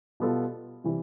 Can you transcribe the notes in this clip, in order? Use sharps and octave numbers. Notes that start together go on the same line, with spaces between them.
B2 G3 B3 F4 A4
C3 E3 G3